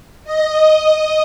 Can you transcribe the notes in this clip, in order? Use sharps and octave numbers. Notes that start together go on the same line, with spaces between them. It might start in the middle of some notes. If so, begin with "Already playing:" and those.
D#5